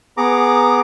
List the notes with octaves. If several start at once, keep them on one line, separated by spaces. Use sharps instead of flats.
B3 G#4 A#5 D6